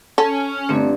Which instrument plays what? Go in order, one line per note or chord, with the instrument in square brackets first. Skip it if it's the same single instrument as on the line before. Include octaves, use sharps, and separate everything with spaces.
[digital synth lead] C#4 [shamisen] A4
[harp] G1 [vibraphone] A3 C4 D4